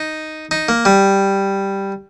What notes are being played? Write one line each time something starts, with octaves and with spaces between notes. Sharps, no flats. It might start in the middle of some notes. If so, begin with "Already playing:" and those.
Already playing: D#4
D#4
A#3
G3